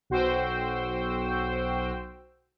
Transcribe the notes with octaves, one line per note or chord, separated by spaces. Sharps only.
B1 F#4 C5 G5 E6